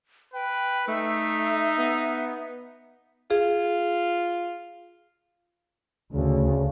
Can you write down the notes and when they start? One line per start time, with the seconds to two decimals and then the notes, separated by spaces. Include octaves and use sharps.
0.34 B4 G5
0.88 A3 D#4 E5
1.78 B3
3.30 F4 G#4
6.14 D2 C#3